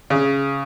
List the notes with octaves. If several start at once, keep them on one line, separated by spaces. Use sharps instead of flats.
C#3